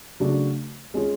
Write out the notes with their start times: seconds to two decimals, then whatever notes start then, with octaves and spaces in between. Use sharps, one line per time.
0.20 C#3 F#3 A3 D4 F#4
0.94 G#3 C#4 F4 G#4